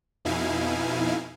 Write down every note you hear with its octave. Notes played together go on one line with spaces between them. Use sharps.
F2 B2 D#4 E4 F5 G#5